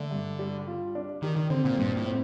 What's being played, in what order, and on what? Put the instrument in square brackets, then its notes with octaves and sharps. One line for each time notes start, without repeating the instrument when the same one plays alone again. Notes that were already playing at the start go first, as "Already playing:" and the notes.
Already playing: [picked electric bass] D3 [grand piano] A3 D4
[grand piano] G2
G3
F4
D4
[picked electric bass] D#3 [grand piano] G4
[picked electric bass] D#3
[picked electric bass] D3 [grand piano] C4
[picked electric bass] A#2
[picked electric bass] G2 [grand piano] A#2
[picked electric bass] A2
[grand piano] C4